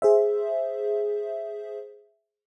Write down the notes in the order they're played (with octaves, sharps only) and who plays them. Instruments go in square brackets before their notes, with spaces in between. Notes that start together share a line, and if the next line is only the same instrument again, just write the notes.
[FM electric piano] G#4 C5 E5